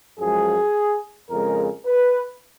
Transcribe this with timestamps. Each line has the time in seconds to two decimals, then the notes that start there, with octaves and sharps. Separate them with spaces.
0.20 F#2 F3 G#3 G#4
1.30 F2 C#3 G#3 A#4
1.86 B4